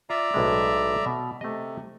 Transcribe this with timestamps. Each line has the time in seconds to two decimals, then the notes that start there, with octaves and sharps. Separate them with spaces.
0.10 F4 D5 E5 A#5
0.34 B1 A2 G#3
1.06 B2
1.41 C3 A3 D#5